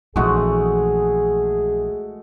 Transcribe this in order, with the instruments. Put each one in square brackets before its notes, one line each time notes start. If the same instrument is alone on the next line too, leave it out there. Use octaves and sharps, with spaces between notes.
[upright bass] A#1 E3 [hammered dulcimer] G#3 A3 F#4 [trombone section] G#4